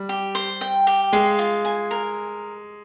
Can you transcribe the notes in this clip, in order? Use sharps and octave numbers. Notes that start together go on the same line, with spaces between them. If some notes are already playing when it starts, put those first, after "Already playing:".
Already playing: G3
G4
C5
G5
G4
G#3 F5
F4
G#5
A#4